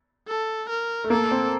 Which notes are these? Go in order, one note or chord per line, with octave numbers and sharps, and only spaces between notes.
A4
A#4
A3
A#3 A4
C4